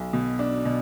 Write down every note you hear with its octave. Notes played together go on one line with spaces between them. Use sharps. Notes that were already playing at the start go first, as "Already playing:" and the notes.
Already playing: B1
B2
D4
B2